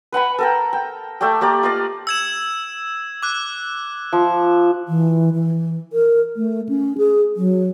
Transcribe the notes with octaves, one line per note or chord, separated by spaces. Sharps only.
B4 F#5 G#5 B5
A4 A#4 G5
G5
A3 A4 D5 G5
A#3 G4 D5
F4 D5 D#5 F5
E6 G#6 E7
D6 F#6
F3
E3
E3
A#4
A3
C#4
G#4
F#3